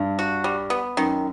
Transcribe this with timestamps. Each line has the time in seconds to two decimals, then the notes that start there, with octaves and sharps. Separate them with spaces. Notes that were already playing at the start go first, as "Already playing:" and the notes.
Already playing: G2
0.19 F#4
0.44 G3
0.70 B3
0.97 F#2 D#3